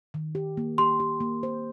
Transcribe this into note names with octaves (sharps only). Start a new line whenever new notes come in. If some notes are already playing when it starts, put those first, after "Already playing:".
D#3
G4
A#3
G4 C6
G4
A#3
C5